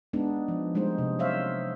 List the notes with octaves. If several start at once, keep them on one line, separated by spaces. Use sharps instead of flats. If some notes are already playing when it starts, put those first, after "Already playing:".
G#3 B3 D4 D#4
F3
G3 G#3 A#3 D#4 C5
C3
F#3 C5 C#5 E5 F5